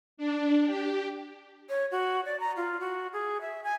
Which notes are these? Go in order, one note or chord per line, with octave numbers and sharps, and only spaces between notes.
D4
G4
C#5
F#4
D5
A#5
F4
F#4
G#4
E5
G#5